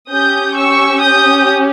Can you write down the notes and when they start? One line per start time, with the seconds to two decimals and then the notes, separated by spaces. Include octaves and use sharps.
0.11 C#4 G4 D#6 G6
0.56 C#6 E6
1.02 D#6 G6